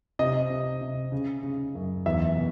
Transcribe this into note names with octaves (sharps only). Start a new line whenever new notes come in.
C3 D#5
C3
C3
C#3
C#3
F#2
E2 E5
B2